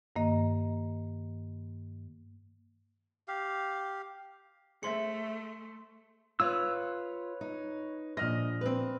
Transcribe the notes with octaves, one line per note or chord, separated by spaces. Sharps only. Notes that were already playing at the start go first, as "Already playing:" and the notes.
G2 D#3 A#3 D#5
G4 F5
A3 G#4 C5 E5 C6 C#7
F4 B4 C#5 E6
D#4
A#1 D#5 F6 A#6
C4 B4